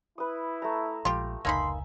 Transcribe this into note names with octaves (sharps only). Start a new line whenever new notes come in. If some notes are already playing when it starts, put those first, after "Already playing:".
E4 B4 D#6
A3 A#5
A#1 F3 G#3 F4 G4
F1 C#2 A#3 D#4 E5 G#5 B5 C6